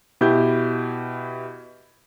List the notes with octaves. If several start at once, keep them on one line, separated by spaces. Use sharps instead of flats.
B2 E4 G4 G6